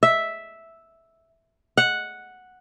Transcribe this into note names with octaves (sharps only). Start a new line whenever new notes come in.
E5
F#5